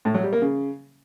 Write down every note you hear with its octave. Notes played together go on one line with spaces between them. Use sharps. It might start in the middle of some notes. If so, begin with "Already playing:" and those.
A2
F#3
G3
A#3
C#3